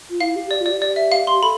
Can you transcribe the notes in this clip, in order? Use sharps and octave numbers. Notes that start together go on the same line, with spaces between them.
F4
E4 F5
G4
G4 D5
F4 D5
G4
D5
E5
F5
C6
A4 B5